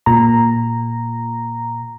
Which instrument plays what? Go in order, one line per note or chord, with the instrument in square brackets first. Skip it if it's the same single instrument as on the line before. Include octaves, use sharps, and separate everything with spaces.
[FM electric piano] A#2 A#5